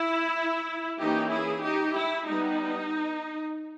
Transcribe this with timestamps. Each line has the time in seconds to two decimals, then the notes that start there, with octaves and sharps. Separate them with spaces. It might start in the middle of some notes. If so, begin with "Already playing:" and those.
Already playing: E4
0.99 E3 A#3 C#4 D#4 G4
1.31 E4 G#4
1.63 D#4 G4
1.95 E4
2.26 G3 B3 D#4